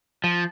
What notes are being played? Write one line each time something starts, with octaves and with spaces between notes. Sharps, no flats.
F3